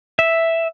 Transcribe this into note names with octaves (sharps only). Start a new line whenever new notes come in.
E5